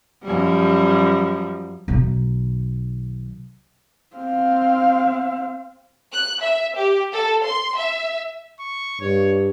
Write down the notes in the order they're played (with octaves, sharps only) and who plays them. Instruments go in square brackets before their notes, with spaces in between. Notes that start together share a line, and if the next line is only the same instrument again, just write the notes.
[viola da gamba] F#2 F3 G3
[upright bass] B1 D#3
[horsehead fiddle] C4 F5
[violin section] F#6
E5
G4
A4
C6
E5
[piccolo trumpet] C#6
[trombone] G2 [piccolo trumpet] C#5